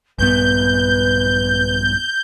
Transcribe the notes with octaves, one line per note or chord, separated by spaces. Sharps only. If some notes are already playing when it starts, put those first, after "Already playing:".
A#1 G2 B3 B4 G6